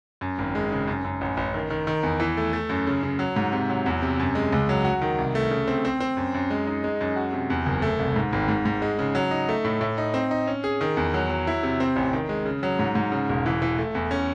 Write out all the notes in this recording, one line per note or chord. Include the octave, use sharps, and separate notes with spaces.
F#2
G#1
G#3
C#3
F#2
F#2
A1
A1
D#3
D#3
D#3
E2
E3
A3
A3
F#2
C#3
C#3
F#3
G#2
C3
F#3
E2
C3
F#2
G#3
C#2
F#3
F#4
D#3
C2
A3
C#3
C4
C4
C4
F#2
F#2
G#3
D#4
G#3
F#2
F#4
C3
E2
F#1
A3
C2
G#2
G#1
G#2
G#2
G#3
C#3
F#3
D#4
A3
A2
A2
D#4
C4
D#4
C#4
G#4
D#3
E2
F#3
F#3
E4
C3
C4
A1
D#3
G#3
C#3
F#3
G#2
G#2
C#3
E1
E3
E3
A3
E2
C#4